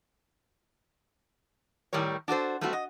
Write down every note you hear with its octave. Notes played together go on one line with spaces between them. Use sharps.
A2 D#3 G3 A#4 C#5
D4 F#4 A4 C5
G3 A3 B3 C4 F#4
D#5